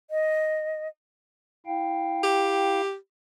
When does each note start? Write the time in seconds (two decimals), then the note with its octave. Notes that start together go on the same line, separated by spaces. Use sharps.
0.10 D#5
1.66 E4 F5 G5
2.23 G4